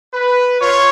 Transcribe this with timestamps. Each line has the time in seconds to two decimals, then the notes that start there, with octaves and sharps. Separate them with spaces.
0.12 B4
0.59 F4 C#5